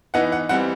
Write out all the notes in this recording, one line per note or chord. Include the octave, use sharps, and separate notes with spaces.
E3 B3 D#4 F#5
F#5
E3 G3 C4 F#5